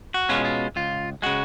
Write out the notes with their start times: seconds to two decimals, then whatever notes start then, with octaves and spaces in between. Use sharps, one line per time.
0.14 F#4
0.29 B2 G#3 C#4 F4
0.45 F4
0.76 C#2 F4
1.22 C#3 G#3 F#4